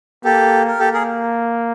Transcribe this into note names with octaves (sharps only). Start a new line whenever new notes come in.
A#3 G4 A4
A#4
A#3 G4 A4
G#4 A#4